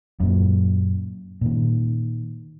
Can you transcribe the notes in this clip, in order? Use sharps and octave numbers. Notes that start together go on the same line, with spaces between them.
F#2 A#2
A#2 D#3